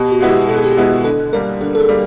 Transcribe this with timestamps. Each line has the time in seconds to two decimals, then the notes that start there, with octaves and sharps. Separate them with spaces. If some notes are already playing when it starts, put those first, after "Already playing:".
Already playing: B2 G4
0.12 F#4
0.20 G#3 B3 E4
0.30 G4
0.49 B2 A4
0.57 G#4
0.64 G4
0.72 G#4
0.77 G#3 B3 E4
1.04 D3 A4
1.33 G3 A#3 A#4
1.61 D3 A4
1.75 A4
1.80 G#4
1.89 G3 A#3